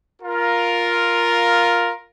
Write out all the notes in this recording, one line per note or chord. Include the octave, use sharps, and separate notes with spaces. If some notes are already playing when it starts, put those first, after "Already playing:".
F4 A#4